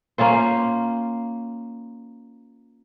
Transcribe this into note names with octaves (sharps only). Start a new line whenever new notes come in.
A#3 C#4 F4 C5